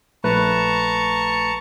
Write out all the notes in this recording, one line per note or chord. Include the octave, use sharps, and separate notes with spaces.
A#1 A3 B4 A5 A#5 C#6